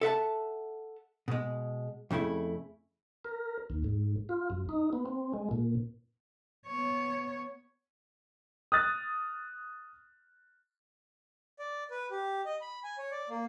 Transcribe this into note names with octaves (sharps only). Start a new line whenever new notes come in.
A4 E5 F#5 A5
B2 G#3
F2 C#3 A3 E4
A#4
D#2
G#2
F4
F#2
D#4
B3
C4
G#3
A#2
B3 C#5
D#6 F6 F#6 A6
D5
B4
G4
D#5
B5
G#5
C#5
D5
A#3